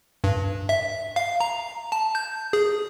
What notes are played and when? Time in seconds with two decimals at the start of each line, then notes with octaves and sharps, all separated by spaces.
0.24 G2
0.69 E5
1.16 F5
1.40 A#5
1.92 A5
2.15 G6
2.53 G#4